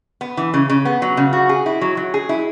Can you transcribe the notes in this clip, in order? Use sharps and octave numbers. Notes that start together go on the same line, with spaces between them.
B3
E3
C#3
C#3
B3
F#3
C#3
F#4
G#4
E4
F#3
F#3
G#4
E4